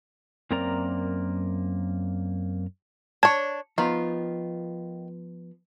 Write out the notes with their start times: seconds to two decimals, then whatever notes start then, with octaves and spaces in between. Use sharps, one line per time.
0.51 F#2 A#3 C4 A#4 D5 A#5
3.23 D4 C#5 A5 G#6
3.78 D#3 F3 B3 F4